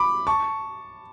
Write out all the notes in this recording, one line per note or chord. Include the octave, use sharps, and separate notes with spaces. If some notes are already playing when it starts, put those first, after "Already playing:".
Already playing: B5 D6
A5 C#6